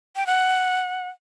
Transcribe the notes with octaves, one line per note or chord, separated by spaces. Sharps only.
G5
F#5